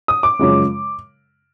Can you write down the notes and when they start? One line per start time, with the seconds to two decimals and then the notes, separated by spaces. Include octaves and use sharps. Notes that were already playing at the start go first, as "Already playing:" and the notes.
0.08 D#6
0.23 D6
0.39 F#2 C#3 F3 G#3